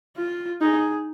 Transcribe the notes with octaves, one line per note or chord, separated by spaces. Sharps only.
F4
D#4 G#4